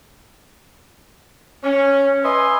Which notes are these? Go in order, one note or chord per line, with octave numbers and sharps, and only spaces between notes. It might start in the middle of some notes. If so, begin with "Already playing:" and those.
C#4
B4 D#5 E5 G#5 C6